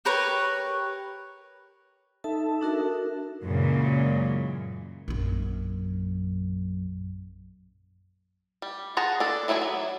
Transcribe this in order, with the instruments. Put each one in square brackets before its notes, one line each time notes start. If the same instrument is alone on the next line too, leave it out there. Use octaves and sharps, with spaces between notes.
[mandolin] G4 A#4 B4 C#5
[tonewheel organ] D#4 A4 E5 [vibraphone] A5
[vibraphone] D4 F#4 A#4
[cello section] F#2 A#2 C#3 E3 G#3
[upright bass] A#1 F#2
[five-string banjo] G3
F4 G#4 F#5 A5 A#5
D4 A4
E3 F#3 E4 F#4 G#4
F#3